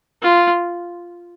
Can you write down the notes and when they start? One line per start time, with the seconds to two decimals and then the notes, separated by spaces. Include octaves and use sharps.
0.22 F4